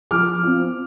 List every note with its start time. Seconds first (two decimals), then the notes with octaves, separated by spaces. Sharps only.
0.11 F3 D6 F6
0.43 C4 F4